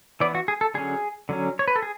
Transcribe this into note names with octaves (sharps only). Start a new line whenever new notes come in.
E3 B3 D5
F#4
G#4
A4
D3 F#3 C#4 G#4
D3 F#3 C#4
C#5
B4
A4
G#4